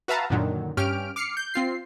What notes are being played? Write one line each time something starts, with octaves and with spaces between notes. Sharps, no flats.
F#4 B4 E5 F5 A5 A#5
F#2 A#2 D3 D#3 F#3
G2 C#4 G4 F6 D7
D6 F6 C7 C#7
G6
C4 F4 C7